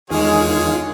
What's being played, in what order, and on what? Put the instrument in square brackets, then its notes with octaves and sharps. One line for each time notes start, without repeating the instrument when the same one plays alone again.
[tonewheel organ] E2 D#3 F4 [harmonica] D3 G#4 C#5 [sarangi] G#3